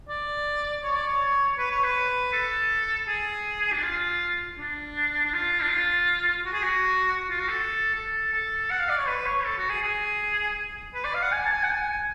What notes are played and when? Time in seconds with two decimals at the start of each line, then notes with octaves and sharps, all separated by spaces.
0.09 D5
0.84 C#5
0.95 D5
1.07 C#5
1.59 B4
1.71 C#5
1.84 B4
2.33 A4
3.08 G#4
3.72 D4
3.83 F4
4.58 D4
5.26 D4
5.34 F4
5.62 D4
5.70 F4
6.46 F#4
6.53 G#4
6.63 F#4
7.30 F4
7.39 F#4
7.49 A4
7.95 A4
8.33 A4
8.71 F#5
8.80 F5
8.89 D5
8.98 C#5
9.08 B4
9.26 C#5
9.45 A4
9.58 F#4
9.70 G#4
9.82 G#4
10.95 B4
11.05 D5
11.14 F5
11.23 F#5
11.32 G#5
11.46 A5
11.52 G#5
11.63 F#5
11.70 G#5